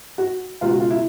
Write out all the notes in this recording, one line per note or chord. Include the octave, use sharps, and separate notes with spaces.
F#4
C#2 B2 F4
F#4
F4
E4